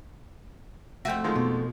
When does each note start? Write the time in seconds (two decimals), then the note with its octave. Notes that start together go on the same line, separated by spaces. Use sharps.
1.05 F2 A3 F#4 E5 G5
1.24 D#3 F3 G#3
1.35 B2